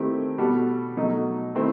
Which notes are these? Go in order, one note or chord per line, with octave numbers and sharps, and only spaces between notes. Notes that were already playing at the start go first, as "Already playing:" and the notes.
Already playing: D#3 A3 C4 E4 G4
B2 G3 B3 F#4 A4
B2 F#3 A3 D#4
D#3 A3 C4 E4